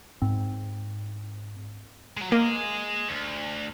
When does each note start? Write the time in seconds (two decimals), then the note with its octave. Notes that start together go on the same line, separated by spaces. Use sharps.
0.22 G#2 C4
2.17 F#3 G#3
2.32 A#3 G#4 D#5
3.08 D2